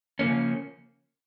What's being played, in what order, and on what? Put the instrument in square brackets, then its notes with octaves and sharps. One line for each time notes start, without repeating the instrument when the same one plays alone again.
[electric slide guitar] C#3 F3 A#3 C#4